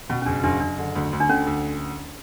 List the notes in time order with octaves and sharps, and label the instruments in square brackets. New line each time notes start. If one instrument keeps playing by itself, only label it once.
[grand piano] B2 [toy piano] C#4
[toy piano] C#4
[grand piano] F#1 [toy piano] D4
[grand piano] F#1 [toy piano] D4
[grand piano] F#1 [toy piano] D4
[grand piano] D3
D2
D2
[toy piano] D4
[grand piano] D3 [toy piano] C#4
[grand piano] D2